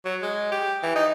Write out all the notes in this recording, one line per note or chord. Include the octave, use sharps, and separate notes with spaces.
F#3
G#3
G4
E3
D#4